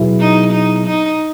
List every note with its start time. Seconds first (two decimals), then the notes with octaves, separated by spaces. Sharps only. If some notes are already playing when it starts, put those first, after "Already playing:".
Already playing: B2 F#3 B3 E4 G#4
0.20 D#4
0.52 D#4
0.86 D#4